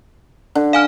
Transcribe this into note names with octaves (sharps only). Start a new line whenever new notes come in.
D3
F5 G#5 F6